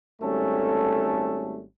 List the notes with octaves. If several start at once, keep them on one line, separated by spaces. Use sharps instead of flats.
G#1 G3 A3 C#4 A4